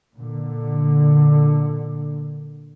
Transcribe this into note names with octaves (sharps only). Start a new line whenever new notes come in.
A#2 D3